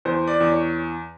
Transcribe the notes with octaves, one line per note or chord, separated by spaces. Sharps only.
E2 C5
D5
E2
C#5